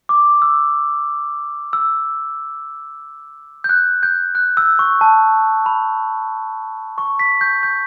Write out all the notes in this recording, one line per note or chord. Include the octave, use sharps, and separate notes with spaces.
D6
E6
E6
G6
F#6
G6
F#6
E6
C#6
A5
B5
C#6
B6
G6
G6